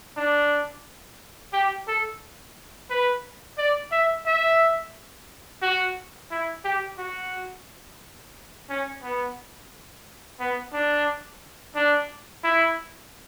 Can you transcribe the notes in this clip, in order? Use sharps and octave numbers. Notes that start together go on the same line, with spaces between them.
D4
G4
A4
B4
D5
E5
E5
F#4
E4
G4
F#4
C#4
B3
B3
D4
D4
E4